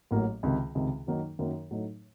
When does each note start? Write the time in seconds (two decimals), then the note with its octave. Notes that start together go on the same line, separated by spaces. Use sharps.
0.11 A1 A2 F#3 A#3
0.43 C#2 C3 D#3
0.75 C#2 C3 D#3
1.07 F#2 D#3 F#3 A#3 D#4
1.39 F#2 D#3 F#3 A#3 D#4
1.71 A2 F#3 A3 D#4